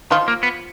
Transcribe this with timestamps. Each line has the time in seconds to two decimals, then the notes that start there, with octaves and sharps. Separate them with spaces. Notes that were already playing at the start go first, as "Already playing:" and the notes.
0.11 D#3 F3 F4
0.28 A#3
0.43 B3